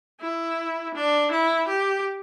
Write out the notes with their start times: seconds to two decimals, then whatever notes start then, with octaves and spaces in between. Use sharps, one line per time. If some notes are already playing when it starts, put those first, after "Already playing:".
0.21 E4
0.95 D4
1.32 E4
1.69 G4